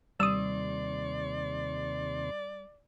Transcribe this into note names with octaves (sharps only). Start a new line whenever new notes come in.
D#2 C3 G3 D5 C6 D#6 E6